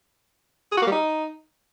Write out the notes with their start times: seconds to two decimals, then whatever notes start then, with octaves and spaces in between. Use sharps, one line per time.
0.72 G#4
0.77 F#4
0.82 A#3
0.87 G3
0.92 D#4